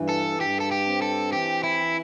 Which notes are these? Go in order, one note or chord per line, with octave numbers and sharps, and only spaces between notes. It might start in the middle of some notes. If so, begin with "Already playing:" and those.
Already playing: G2 E3
A4
G2 G4
A4
G4
C4
A4
E3 G4
E4